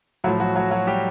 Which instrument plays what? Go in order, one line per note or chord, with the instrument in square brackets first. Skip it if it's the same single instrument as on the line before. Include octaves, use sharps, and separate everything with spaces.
[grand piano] A2 F#3 F#4
F3
F#3 F#4
F#3 F#4
F#3 F#4
G3 G4